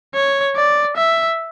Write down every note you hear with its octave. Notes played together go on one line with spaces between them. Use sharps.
C#5
D5
E5